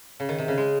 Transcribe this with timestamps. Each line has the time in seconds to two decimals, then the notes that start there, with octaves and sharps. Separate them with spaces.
0.20 C#3
0.29 D#3
0.38 C3
0.48 C#3
0.58 G#3